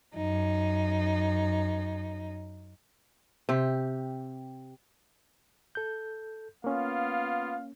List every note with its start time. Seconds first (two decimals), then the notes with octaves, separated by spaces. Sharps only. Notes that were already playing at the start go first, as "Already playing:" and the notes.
0.16 F#2 D#4
3.49 C3 G4
5.75 A4 G6
6.64 A#3 B3 C#4 F4 F5